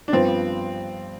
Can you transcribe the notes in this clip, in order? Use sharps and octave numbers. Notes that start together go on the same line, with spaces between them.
D4
G2 F3 B3 C4 F4 B4